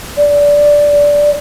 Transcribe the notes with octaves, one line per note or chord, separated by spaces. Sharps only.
D5